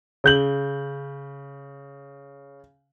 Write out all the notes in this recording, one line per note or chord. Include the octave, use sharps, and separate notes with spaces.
C#3 G6 F#7